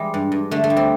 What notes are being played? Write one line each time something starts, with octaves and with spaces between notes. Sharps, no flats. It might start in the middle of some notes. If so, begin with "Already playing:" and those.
Already playing: E3 G3 G#3
G2
G2
D3 A3
A3
G3
C4